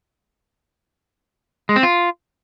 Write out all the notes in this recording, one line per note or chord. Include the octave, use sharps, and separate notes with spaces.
G#3
C4
F4